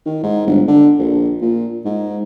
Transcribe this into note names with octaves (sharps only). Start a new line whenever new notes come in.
D#3
G#2
G1
D3
A#1
A#2
G#2